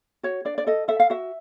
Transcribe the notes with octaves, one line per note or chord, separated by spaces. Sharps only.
F#4 C#5
D4 D5
D5
A4 D#5
A4 E5
F5
F#4 E5